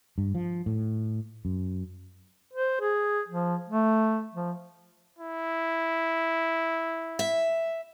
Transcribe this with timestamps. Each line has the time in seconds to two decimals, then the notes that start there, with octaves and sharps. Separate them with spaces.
0.18 G2
0.35 F3
0.66 A2
1.45 F#2
2.53 C5
2.81 G#4
3.28 F3
3.69 A3
4.34 F3
5.19 E4
7.19 E5